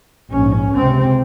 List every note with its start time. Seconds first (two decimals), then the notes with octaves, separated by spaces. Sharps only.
0.31 A#1 G#2 C#4
0.74 C#2 C3 C4